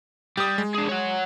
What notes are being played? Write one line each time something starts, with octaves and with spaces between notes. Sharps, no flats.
G3 G4 D#6
G#3
D4 G#4
C#5 F#5